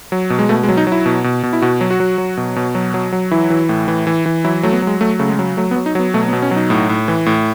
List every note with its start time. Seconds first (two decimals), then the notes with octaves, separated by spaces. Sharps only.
0.12 F#3
0.30 B2
0.39 G#3
0.49 B2 A3
0.63 G#3
0.68 F#3
0.77 D#4
0.87 F#3
0.92 E4
1.06 B2
1.24 B2
1.43 B2
1.53 E4
1.62 B2 F#4
1.81 F#3
1.91 F#4
2.00 F#3
2.18 F#3
2.37 B2
2.56 B2
2.75 F#3
2.94 F#3
3.12 F#3
3.31 E3 E4
3.50 E3
3.69 A2
3.88 E3
4.07 E3
4.26 E3
4.45 F#3 E4
4.63 F#3 A3
4.72 B3
4.82 F#3 G#3
5.01 F#3 A3
5.19 C#3 A3
5.29 G#3
5.39 F#3
5.57 F#3 A3
5.71 B3
5.76 F#3
5.86 D#4
5.95 F#3 B3
6.14 B2 A3
6.28 B3
6.33 B2
6.42 C#4
6.51 F#3
6.56 D#4
6.70 A2
6.89 A2
7.08 E3
7.26 A2